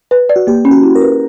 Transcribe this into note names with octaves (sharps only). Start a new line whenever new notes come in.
B4
D5
F#4
A#3 G4
C#4
F#4
E4
A#4
B4